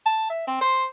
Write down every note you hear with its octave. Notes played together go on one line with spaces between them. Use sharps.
A5
E5
C4
C5